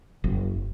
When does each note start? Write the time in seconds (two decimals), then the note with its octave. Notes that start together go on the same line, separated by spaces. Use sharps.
0.24 F#1